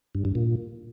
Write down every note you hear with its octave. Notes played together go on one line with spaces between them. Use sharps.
G2
G2
A#2